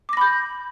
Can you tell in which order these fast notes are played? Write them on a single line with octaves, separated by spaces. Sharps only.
D6 A#6 B5 G6